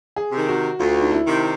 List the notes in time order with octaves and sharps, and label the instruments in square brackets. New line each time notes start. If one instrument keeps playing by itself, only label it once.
[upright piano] G#4
[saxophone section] C3 D#3
[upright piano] F#4
[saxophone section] D2 [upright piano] F4
[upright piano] D#4
E4
[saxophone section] C3 D#3